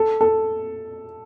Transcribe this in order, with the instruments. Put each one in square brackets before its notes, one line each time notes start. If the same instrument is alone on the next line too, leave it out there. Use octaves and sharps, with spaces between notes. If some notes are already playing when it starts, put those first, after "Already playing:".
Already playing: [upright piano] A4
A4